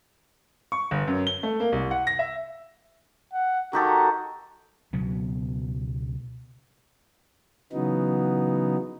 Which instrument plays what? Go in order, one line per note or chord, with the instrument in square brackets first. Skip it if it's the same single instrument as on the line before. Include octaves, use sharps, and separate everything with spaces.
[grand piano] C#6
G1
F#2
G7
A3
A#3
C2
F#5
A#6
E5
[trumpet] F#5
[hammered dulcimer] D#3 G4 A4 [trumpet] F#4
[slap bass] C#2 B2 F#3 B3
[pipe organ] C#3 E3 F#3 B3 D#4